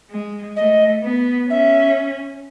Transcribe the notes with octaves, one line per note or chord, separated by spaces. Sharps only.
G#3
A3 D#5
B3
C#4 E5